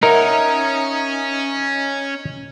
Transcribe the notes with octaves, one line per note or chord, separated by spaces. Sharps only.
C#4 D#4 A#4 D#5 E5 F#5